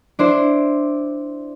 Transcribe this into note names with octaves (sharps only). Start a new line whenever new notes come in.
D4 E4 C5